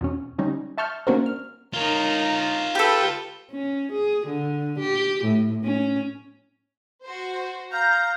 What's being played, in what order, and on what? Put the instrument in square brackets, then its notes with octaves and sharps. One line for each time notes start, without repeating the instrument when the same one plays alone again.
[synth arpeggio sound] E2 B2 C#4
D3 G3 C#4 D#4
E5 A5 C#6 F6 G6
A#3 C#4 D4 F#4 A#4 C5
F6
[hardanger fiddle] D#4 A#4 [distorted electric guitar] F4 C#5
[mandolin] G4 A4 [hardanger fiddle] B4 G5
[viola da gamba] C#4
G#4
D3
G4
A2
C#4
[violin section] F#4 C5
[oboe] F5 [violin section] A#5 [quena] G6